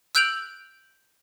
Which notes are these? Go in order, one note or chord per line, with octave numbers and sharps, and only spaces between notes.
E6 F#6 G6 D7 F7 F#7